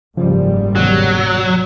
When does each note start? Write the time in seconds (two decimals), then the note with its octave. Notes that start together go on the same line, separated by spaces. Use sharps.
0.17 F#1 G#2 C#3 F3 G3
0.76 D#2 B2 F#3